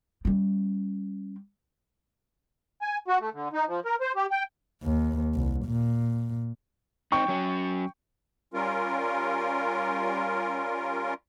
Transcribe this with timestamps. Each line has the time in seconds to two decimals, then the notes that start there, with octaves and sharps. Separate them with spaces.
0.25 G3 C#4
2.82 G#5
3.08 F#4
3.21 A3
3.34 D3
3.53 D#4
3.68 F3
3.85 A#4
4.01 C5
4.16 G4
4.31 G5
4.83 D#2
5.34 C2
5.65 A#2
7.12 C4 D#4 G5 C#6
7.28 F#3 C#4
8.54 G3 C#4 F4 A#4